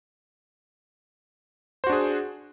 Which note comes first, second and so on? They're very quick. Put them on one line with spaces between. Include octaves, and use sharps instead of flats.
C5 F#4 D4 G#4